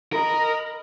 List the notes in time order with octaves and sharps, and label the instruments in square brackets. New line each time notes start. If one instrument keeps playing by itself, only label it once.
[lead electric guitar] A#4 [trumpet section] D#5 A#5 B5